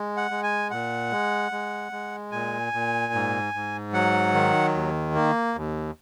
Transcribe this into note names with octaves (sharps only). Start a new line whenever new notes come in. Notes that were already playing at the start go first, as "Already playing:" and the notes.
Already playing: G#3
F#5
G#3
G#5
A#2 F#5
G#3
G#3
G#3
A#2 G#5
A#2
G#2
G#2
F#3 F#5
D#3
D#2
A#3
D#2